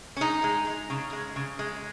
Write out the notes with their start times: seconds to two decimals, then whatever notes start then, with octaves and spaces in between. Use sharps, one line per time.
0.17 C#4
0.21 G#3 D#4
0.44 G#3
0.67 G#3
0.90 C#3
1.13 G#3
1.36 C#3
1.59 G#3